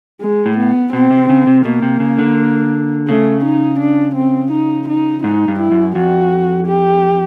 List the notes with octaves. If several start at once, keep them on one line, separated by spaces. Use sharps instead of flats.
G#3
A2
B3
B2 C4
C3
C#3
C3
B2 A#3
C3
C#3
D3
C#3 A3
D#4
D4
C4
D#4
D#4
G#2 D#4
G2
E4
F#2
F2 F#4
G4